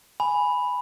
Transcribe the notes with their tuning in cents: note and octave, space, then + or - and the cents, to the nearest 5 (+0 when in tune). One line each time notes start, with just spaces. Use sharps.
G#5 +0 B5 +0